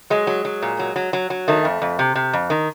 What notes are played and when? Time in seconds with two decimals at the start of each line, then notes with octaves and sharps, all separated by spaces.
0.10 F#3 G#3
0.27 F#3
0.45 F#3
0.62 A#2
0.79 F#3
0.96 F#3
1.13 F#3
1.30 F#3
1.48 D#3 A3
1.65 F2
1.82 F2
1.99 C3
2.15 C3
2.33 F2
2.50 D#3